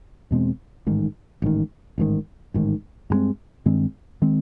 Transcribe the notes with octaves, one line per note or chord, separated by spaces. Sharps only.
E2 B2 G#3 C4
A1 G#2 D#3
A1 G#2 D#3
A1 G#2 D#3
A1 G#2 D#3
G2 D#3 G#3 C4
G2 D#3 G#3 C4
D#3 G#3 C4